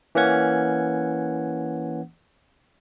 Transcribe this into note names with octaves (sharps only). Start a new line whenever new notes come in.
E3 A#3 C#4 F#5 G#6